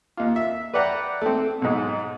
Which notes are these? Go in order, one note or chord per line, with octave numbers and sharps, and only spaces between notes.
D#2 F4
E5
B4 D5 E5 F#5 G5 A#5
A3 C4
B1 G#2